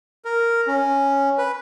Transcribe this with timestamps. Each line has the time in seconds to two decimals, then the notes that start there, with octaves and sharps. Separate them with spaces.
0.25 A#4
0.67 C#4
1.38 B4